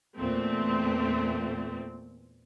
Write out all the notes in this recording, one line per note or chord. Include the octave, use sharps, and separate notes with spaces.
E2 A#2 A3 C4